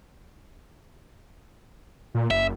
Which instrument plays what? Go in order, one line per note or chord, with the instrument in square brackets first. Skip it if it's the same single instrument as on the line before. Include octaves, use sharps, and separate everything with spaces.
[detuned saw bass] A#2
[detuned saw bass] F#1 [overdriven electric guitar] E5